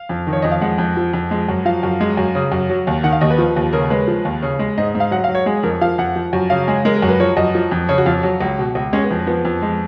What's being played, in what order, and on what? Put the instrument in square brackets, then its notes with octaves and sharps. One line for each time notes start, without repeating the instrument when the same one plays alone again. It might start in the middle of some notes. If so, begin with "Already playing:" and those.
Already playing: [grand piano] F5
F2
D#3
C#5
F2 D#5
F5
G#3 F#5
F2
F3
F2
G#3
F#2
F3 F5
F#2
G#3
F#2
C#3
F#2
F#3
D#2
D#3 F#5
F5
D#2 D#5
B4
F3
D#2
C#3 A#4
G#3 B4
F3
D#2
C#3
G#3
G#2 D#5
G#2
F5
F#3 F#5
F5
F#3
C#5
G#3 G#4
F2 A#4
F3 F5
F2 F#5
F3
F#2
C#3 F5
G#3 G#4
G#3 A#4
A#4
F#2
B4
F3 C#5
F#2 D#5
F3
F2
C#3 C#5
F#4
F2 F4
F#3
C#2
B2
C#2
G#3 C#4
B3
F2
F3 B3
F2
G#3